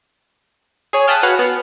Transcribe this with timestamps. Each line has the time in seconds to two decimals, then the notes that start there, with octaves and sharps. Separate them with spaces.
0.93 G#4 C#5 G#5
1.07 F5 G5 A5 D#6 F#6 B6
1.23 F#4 B4 C#5 F5 F#5
1.39 B3